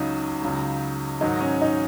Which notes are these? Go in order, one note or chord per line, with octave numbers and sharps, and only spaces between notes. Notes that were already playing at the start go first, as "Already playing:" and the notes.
Already playing: C#2 C#3 F#3 D#4
C#2 C#3 F#3
G#2 D#3 F#3 D#4
C#4
D#4